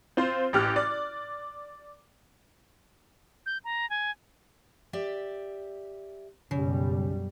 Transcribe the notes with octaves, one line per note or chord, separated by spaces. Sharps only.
C4 F4 C5
A1 G4 F6 F#6
D5
G6
A#5
G#5
G4 D5 E5
B1 F#2 C#3 G3